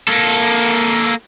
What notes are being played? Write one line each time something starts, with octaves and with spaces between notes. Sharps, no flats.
A#3 A4